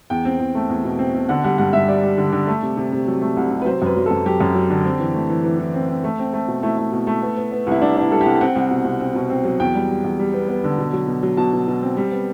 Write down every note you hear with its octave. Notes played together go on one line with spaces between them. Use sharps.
E2 G5
C4
E2
A3
E2
B2
C4
B2
D3 F#5
G3 F#5
G2 F#5
G2 E5
G3 D5
G3
D3
D3
A3
C3
C3
C3
F#3
A3
C2
C3
B4
F#3 C5
F#2 B4
F#3
A4
F#2
F#3 G4
F#2
F#3
D3
C4
E3
A3
E3
E3
E3
C4
C4
A3
C4
A3
B2
A3 E4
A3
B2
A3
B3
B3
B3
C2 E4
C2 D4
B3 D4 E4
G3 A4
G4
C2
C4 F#5
C2
B2
C2
C4
B2
C4
F#3
E2 G5
G3
G3
E2
G3
B3
B3
D3
B2
F#3
B2
F#3
B2 A5
B2
B2
C4
G3
B3